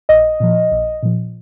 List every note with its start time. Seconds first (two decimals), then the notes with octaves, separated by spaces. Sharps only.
0.09 A#1 D#5
0.40 A#2 F3
0.72 A#1
1.03 A#2 F3